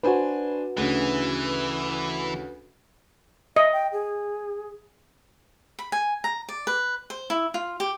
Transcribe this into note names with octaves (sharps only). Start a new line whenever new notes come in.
D4 F#4 B4 C5 G#5
D2 C#3 E3
D#5 E5
G5
G#4
B5
G#5
A#5
D5
B4
C5
E4
F4
G4